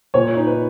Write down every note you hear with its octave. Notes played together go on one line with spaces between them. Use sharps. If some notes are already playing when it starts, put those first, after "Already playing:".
A#2 C#5
D#4
B4